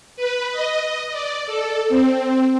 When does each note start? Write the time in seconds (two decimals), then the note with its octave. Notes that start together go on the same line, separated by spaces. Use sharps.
0.16 B4
0.52 D#5
1.12 D5
1.46 A4
1.89 C4